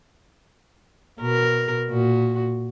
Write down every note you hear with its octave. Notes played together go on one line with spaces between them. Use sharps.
B2 A#4
A#2 F#4